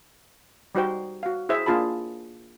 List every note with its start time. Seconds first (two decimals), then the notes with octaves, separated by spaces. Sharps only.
0.75 G3 D#4 F#4 C5 G5
1.23 F#4 F5
1.49 E4 G#4 C5 E5
1.66 A#3 D4 F4 G#4 A5 B5